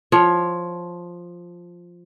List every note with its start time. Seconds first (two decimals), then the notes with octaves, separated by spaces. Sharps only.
0.12 F3 C#5